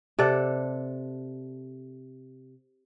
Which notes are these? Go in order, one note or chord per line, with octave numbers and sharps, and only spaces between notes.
C3 A4 D5 F#5